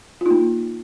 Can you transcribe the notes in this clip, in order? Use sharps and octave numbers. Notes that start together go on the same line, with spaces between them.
A#3 D#4 F4